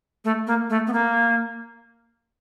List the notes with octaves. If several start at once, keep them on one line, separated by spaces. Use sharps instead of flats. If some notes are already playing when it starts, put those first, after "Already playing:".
A3
A#3
A3
B3
A#3